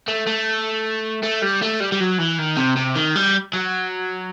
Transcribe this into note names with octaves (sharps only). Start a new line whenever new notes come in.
A3
A3
A3
G3
A3
G3
G3
F#3
E3
D#3
C3
C3
D#3
G3
F#3